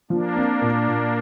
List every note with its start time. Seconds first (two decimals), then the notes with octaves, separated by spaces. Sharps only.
0.10 F3 A#3 D4
0.36 C4
0.62 A#2
0.88 A#2